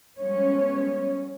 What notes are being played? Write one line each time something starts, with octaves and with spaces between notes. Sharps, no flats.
F3 G3 G#3 B3 C#4 C#5